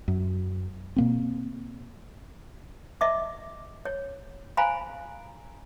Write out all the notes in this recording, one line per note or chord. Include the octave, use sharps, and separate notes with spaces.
F#2
B2 A#3 C4
D#5 E5 D6
C#5
C5 F5 G#5 A#5 B5